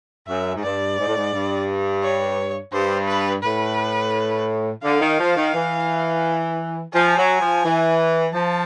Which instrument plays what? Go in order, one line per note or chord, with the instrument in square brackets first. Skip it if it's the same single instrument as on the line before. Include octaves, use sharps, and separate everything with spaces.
[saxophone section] F#2 [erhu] E5
[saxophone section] G#2
[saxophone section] G2 [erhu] D5
[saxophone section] G#2
A2
G#2
G2
[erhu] C#5
[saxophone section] G2 [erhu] C5
[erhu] B4
[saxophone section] A2 [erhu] B4
[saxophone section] D3 [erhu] F5
[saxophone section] D#3
F3
D#3
E3
[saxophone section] F3 [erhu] G#5
[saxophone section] F#3
F3
E3
[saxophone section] F3 [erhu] A5